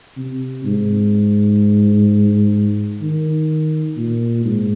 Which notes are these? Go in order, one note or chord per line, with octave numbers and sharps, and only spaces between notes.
C3
G#2
D#3
A#2
G#2